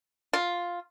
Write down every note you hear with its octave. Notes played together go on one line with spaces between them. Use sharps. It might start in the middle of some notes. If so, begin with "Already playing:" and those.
F4